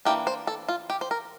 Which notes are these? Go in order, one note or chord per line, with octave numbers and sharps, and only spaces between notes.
E3 A#3 D4 G4
C5
A4
F4
G4
C5
A#4